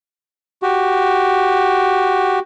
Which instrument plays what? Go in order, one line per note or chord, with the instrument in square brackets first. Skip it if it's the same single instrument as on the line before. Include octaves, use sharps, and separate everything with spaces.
[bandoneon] F#4 G4